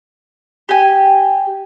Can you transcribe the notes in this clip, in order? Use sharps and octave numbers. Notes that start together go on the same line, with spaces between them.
G4 G#5